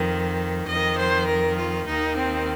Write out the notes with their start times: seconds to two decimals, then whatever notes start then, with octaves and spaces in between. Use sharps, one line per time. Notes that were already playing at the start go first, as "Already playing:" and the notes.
Already playing: F2 D#3
0.67 F2 D#3 D#5
0.97 C5
1.26 A#4
1.57 F4
1.86 D#2 D#3 D#4
2.16 C4